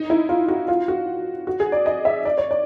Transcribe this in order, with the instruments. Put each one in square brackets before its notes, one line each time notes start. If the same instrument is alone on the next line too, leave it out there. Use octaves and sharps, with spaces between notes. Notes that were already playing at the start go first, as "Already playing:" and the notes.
Already playing: [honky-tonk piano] D#4
E4
F4
F#4
F4
F#4
F#4
G#4
D5
D#5
E5
D5
C#5
D5